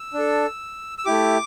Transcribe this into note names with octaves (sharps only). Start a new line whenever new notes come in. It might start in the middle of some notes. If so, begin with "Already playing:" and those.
Already playing: E6
D4
A4
E6
A3 E4 G4 D6